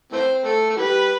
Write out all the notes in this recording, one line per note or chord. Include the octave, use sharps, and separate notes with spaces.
E3 A3 C4 C5
A3 A4
A3
E3 G3 B4